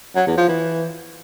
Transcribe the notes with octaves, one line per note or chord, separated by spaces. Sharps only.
F#3
E2
F3
E3